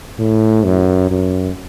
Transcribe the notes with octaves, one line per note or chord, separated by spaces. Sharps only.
A2
F#2
F#2